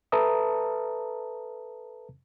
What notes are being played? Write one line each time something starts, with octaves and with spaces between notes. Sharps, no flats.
A4 B4 E5 A5 A#5 D#6